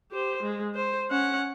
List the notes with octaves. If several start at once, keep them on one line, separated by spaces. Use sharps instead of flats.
G4 C5
G#3
C5
C#4 F#5